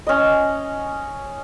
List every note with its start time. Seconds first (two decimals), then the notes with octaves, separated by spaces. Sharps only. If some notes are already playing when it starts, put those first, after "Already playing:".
0.07 C#4 D#5